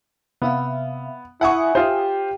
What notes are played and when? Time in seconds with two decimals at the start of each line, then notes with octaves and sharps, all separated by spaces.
0.42 C3 B3 E5 F5
1.41 E4 E5 F#5 G#5 C#6 D#6
1.75 F4 G4 C5